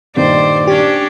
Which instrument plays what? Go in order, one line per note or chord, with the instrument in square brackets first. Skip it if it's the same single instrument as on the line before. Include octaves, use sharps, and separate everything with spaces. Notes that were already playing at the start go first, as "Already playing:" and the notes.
[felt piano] G2 A#2 D#3 [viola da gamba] C5 [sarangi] D5
[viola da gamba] C#4 D4 [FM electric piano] G4